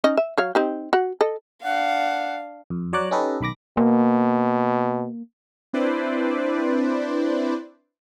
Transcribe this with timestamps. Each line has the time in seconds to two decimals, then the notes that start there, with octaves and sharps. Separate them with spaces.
0.04 C#4 D#4 D#5
0.17 E5
0.38 F#3 C#5 F5
0.55 C4 D#4 G4
0.93 F#4 F#5
1.21 A4 D#5
1.63 D4 F5 F#5
2.70 F2
2.93 F#3 C#5 D5 A#5 D6 F#6
3.11 C#4 D#4 G4 A4 B4 D#5
3.41 B1 D#3 B5 D6 A#6
3.77 B2 A#3
5.73 C4 D4 E4 B4 C5 D5